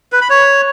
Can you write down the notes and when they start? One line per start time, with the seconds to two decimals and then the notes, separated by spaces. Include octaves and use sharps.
0.12 B4
0.21 B5
0.30 C#5